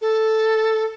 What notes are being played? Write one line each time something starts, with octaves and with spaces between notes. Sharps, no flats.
A4